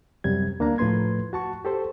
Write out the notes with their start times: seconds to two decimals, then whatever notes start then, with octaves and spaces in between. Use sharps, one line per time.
0.24 F#2 C3 F#3 G3 G#6
0.60 D2 A#3 D4 F5 A#5
0.78 A2 F3 A3 B4 C6 G#6
1.33 F#4 A5 C#6
1.65 G4 A4 C5